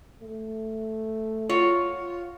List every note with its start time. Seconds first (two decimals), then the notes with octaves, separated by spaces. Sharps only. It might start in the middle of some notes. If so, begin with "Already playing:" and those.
0.22 A3
1.49 F4 F#4 C#5